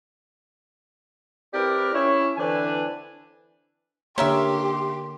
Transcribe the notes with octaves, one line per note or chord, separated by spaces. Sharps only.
C4 E4 G4 A#4 B4 D5
C#4 E4 C#5
D3 E3 C4 D4 B4 G#5
D3 A#3 C#4 G4 A#4 E5 C6